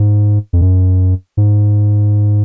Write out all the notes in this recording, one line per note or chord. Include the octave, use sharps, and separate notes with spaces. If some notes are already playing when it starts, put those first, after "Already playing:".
Already playing: G#2
F2
F#2
G#2